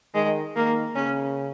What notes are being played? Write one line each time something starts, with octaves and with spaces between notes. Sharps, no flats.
D#3 G#3
D#3 A#3
C#3 C#4